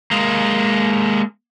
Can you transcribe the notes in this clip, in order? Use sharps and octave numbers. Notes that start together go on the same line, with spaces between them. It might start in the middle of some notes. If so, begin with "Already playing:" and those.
G#3 A#3